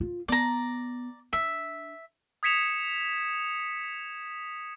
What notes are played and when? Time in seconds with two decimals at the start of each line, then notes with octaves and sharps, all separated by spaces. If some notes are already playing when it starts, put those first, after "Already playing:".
0.01 F4
0.28 B3 D5 A#5
1.33 D4 E5
2.43 D#6 G#6 B6 C#7 E7 F7